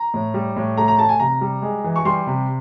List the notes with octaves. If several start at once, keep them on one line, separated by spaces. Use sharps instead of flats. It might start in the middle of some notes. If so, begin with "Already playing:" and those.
Already playing: A#5
A2
G3
A2
A3 A#5
A#5
A3 A5
G#5
C3 A#5
G3
G#3
E3
C#6
G3 C6
C3